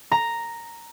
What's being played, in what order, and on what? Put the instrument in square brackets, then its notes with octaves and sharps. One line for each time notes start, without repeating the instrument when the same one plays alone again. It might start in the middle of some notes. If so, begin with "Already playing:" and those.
[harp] A#5